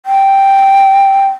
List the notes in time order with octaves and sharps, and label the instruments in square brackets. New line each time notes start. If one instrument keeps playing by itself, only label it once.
[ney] G5